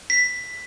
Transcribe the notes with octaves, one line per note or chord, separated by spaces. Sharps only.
B6